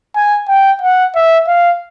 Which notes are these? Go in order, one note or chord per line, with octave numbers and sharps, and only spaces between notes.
G#5
G5
F#5
E5
F5